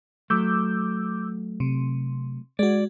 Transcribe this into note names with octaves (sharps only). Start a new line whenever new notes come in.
F#3 A3 D6 E6 G6
C3
G#3 F#4 D5